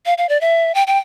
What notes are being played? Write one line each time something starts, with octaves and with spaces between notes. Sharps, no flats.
F5
F5
D5
E5
G5
G5